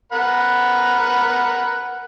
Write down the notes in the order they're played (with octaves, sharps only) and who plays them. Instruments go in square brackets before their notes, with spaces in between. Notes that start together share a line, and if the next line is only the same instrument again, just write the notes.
[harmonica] A#4 F#5 B5